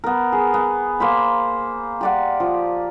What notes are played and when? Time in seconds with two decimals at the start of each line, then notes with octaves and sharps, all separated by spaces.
0.04 B3 A#4
0.32 G#4
0.54 B3
1.00 A#3 C5 B5
2.01 G4 D5 F#5
2.40 F3